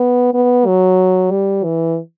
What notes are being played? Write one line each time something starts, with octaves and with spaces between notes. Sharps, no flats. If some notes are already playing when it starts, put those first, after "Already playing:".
Already playing: B3
B3
F#3
G3
E3